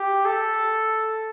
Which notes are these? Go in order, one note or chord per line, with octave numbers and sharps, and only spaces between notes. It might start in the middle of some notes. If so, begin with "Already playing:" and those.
Already playing: G4
A4